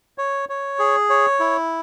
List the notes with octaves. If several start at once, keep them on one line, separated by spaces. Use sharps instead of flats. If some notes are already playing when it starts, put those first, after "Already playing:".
C#5
C#5
G#4
C#5
E4